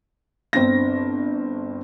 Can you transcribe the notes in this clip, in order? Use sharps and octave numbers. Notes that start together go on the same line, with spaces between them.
G1 C4 D4 A#6